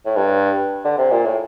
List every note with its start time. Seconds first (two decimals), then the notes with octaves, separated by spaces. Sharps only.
0.05 A2
0.16 G2
0.85 D3
0.98 C3
1.11 A#2
1.26 A2